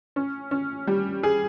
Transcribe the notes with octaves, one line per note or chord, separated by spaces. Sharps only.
C#4
C#4
G3
G#4